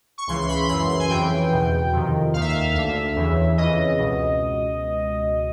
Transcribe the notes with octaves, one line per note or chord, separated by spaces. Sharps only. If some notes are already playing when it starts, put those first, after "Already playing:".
C#6
C#2 C#3 E3 C6
C6
B5
F#2 C#3 E3 C6
C6
G#5
F2 C#3 E3 G5
E2 B2
F2 C3 D#3
D#2 D#3 E5 F5
F5
D2 D3 E5
E2 C#3 E3
F2 C#3 E3 D#5
C#2 B2